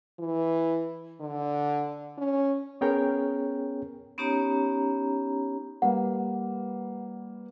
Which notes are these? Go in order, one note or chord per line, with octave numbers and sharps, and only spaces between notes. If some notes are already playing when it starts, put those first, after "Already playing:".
E3
D3
C#4
B3 C#4 G#4 A#4 C#5 G5
B3 C#4 D#4 G4 C#5 A#5
G3 A#3 B4 F#5